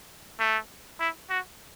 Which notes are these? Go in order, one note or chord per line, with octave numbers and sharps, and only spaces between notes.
A3
E4
F#4